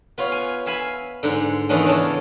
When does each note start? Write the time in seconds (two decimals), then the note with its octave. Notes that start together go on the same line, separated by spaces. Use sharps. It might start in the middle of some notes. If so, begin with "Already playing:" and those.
0.18 B3 F4 C#5 F5
0.32 G#5
0.66 E5 F5 G#5 B5
1.23 G#2 D3
1.69 D#3 E3 B3 C#4 D4
1.86 C#3 E4 A4 C#5 A5